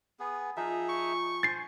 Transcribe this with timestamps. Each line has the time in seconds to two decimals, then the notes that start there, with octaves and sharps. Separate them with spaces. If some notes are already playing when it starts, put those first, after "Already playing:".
0.19 B3 G#4
0.57 F3 D#4 F4 G#4 E5
0.89 C#6
1.43 C5 G#5 A6 C7